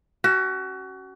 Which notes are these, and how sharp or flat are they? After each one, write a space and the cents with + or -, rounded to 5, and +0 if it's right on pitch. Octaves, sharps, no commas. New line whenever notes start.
C#4 +0 F#4 +30